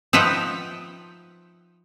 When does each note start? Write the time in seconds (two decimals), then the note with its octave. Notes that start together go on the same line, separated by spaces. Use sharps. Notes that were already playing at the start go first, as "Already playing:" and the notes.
0.13 F3 D#4 B4 E5 F#5 G5